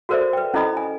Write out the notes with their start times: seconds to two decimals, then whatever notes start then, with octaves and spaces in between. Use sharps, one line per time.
0.09 F#4 A4 A#4 C5 D5 E5
0.33 B4 G5
0.54 C#4 E4 A4 D#5 B5 D#6
0.77 G#5